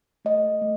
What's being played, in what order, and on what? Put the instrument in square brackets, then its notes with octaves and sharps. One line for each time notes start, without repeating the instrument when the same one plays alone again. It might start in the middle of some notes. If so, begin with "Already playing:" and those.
[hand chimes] A3 D#5
A3